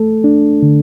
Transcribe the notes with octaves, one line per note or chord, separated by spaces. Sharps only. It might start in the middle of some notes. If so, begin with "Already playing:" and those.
Already playing: A3 A4
D4
D3